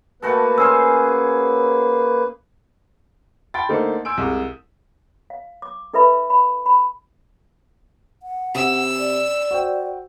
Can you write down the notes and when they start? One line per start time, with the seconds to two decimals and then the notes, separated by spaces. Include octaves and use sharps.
0.22 A3 A#3 F#4 A4 B4
0.58 C#4 G#4 C5 E6
3.54 G5 A5 B5 C6 A6
3.69 D3 A3 A#3 D#4 A4 C5
4.05 G#5 C6 E6 G6 D7
4.17 C2 G#3 D#6
5.30 F5
5.62 D6
5.93 D#4 A4 B4 E5 B5
6.30 B5
6.66 B5
8.23 F#5
8.55 C3 E6
8.99 D5
9.51 F#4 C5 G5